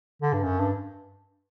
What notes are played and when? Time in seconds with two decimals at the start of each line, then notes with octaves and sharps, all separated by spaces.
0.22 D3
0.33 G2
0.44 F#2
0.59 G2